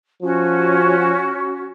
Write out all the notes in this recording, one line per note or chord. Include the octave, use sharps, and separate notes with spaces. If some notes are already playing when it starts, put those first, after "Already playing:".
F3 C#4 F#4